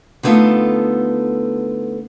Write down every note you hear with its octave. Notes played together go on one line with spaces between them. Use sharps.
D3 A3 B3 D#4 F4 A4